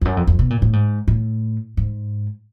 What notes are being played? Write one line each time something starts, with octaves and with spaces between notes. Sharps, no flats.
F2
F#2
F2
F2
B2
A#2
A2
G#2
A2
G#2